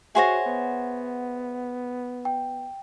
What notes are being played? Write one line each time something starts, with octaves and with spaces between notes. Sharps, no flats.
F#4 G#4 C5 C#5 E5 F#5 A#6
B3
G5